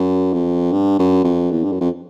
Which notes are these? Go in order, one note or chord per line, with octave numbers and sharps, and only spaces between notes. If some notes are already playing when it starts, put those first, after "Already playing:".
Already playing: F#2
F2
G2
F#2
F2
E2
G2
F#2
F2